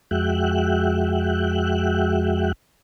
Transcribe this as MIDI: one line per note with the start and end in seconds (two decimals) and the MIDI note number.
0.11 2.52 41
0.11 2.52 56
0.11 2.52 66
0.11 2.52 76
0.11 2.52 79
0.11 2.52 90